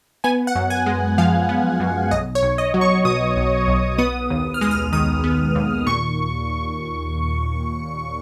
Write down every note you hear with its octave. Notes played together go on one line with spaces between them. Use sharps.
B3 G#5
F#5
F#2
G#5
G#3
F3 F5
B3
F#2
B1 D#5
C#5
B1
D#5
F#3
C#6
B2 D#6
B1
B1
B3 D#6
D#2
F6
G#3 D#6
F6
D#3 D#6
B3
D#2
A#2 C#6